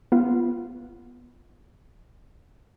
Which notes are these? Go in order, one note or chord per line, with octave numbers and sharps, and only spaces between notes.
B3 F4